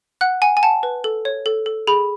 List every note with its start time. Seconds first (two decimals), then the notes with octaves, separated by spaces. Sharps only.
0.21 F#5 F#6
0.42 F#5 G#5
0.57 G#5
0.63 F#5 A5
0.83 B4
1.04 A4
1.25 C#5
1.46 A4
1.66 A4
1.87 G#4 B5